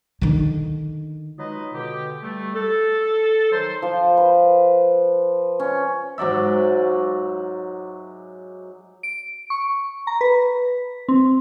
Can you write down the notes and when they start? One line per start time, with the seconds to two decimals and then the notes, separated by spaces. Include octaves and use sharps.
0.21 D3 D#3
1.38 F#3 G#3 D#4 F4 B4 D#5
1.73 B2 D3 G4
2.21 G3 A3
2.55 A4
3.52 D#3 F#3 D#4 C5
3.82 F3
4.17 B4
5.60 C#4
6.18 G#2 F#3 D5 E5
9.03 D7
9.50 C#6
10.07 A#5
10.21 B4
11.09 C4